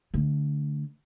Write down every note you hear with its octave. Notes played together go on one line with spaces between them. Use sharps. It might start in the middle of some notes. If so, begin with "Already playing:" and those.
D3 A3